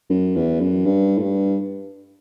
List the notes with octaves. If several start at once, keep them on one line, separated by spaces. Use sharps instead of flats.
F#2
E2
F#2
G2
A2
G2